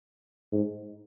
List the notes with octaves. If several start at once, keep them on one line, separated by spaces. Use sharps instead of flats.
G#2